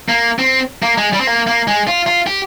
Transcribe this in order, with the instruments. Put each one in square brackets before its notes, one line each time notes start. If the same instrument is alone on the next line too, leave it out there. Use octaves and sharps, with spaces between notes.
[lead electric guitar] A#3
C4
A#3
G#3
G3
C4
A#3
A#3
G#3
F4
F4
G4